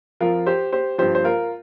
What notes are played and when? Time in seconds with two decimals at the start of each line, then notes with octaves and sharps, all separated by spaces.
0.20 F2 F3 F4 A#4
0.46 G4 C5
0.72 G4 C5
0.98 G2 F3 G4 C5
1.15 C5
1.24 F4 A#4